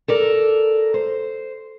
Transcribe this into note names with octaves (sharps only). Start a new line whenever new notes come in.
A4 A#4 D5
C5